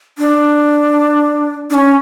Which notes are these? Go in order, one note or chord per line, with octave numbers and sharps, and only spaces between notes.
D4
D4
C#4